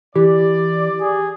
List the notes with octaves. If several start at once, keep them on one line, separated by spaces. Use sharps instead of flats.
E3 G4 D5
G#4